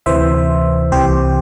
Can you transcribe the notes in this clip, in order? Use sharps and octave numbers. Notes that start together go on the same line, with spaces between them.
D2 C3 E3 C5 E5
C2 C3 E3 G4 C5